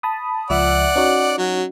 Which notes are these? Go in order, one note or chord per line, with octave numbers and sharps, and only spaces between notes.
A5 B5 D#6
C#2 F3 D5 E5 F#5
C#4 D#4 F#4
F#3